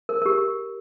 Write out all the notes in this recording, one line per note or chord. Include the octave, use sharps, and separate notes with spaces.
A#4
A#4
G4